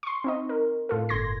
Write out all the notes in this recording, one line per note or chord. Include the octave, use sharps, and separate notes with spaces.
C6 C#6
C4 D#4 D#5
A#4
A2 F4 A4
G1 C6 G#6 A#6